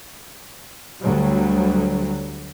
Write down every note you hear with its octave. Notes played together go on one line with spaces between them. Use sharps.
D2 F#3 G3